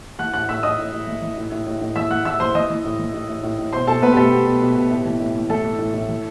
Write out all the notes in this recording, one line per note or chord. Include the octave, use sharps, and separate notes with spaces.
E3 F#5 F#6
A2 F#5 F#6
A2 E5 E6
A2 D#5 D#6
A2
A2
E3
E3
A2
A2
A2
A2
E3 E5 E6
E3 F#5 F#6
E3 E5 E6
E3 C5 C6
E3 D#5 D#6
E3
A2
E3
A2
A2
A2
A2
B2 C5 C6
B2 A4 A5
B2 B3 B4
G4
B2 A3 A4
B2 G4
B2
B2
B2
A2
E3
A2
E3
E3 A3 A4
E3
A2
A2
E3